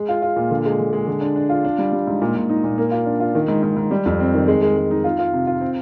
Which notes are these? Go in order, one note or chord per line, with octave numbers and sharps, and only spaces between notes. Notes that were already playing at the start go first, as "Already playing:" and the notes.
Already playing: G#3
F4
F4
A#2
D3
G#3
D3
G#3
D3
D4
D4
F4
D4
G3
G3
G#2
A#2
A#2
D#4
A#2
A#3
F4
D4
F4
D#3
G#2
G#2
G#2
G3
F2
C4
D#3
G#3
G#3
G#3
D#4
F4
F4
C3
F4
C4